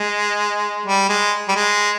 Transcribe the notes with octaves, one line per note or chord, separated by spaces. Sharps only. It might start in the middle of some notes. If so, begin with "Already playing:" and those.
Already playing: G#3
G3
G#3
G3
G#3